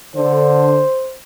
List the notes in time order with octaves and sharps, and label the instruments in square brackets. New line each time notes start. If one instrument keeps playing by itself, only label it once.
[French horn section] D3 [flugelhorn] C5